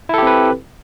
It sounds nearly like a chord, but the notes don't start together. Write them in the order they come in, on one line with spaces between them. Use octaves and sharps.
E4 A4 G4 C4 B4